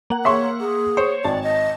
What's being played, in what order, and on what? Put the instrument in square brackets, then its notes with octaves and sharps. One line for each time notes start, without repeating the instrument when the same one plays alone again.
[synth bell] A#3 F#5
[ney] C#5 [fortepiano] E5 C6 C#6
[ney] G#4
[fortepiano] C5 [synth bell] C#5
[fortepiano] G#1 [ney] D5 [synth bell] A5
[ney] D#5